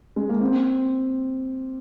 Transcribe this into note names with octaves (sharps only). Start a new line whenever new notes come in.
G#3
A#3
C4